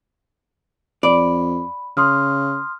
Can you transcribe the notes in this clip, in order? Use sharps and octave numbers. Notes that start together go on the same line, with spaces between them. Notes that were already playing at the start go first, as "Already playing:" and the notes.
F2 D5 B5
C#3 C6 D#6 F6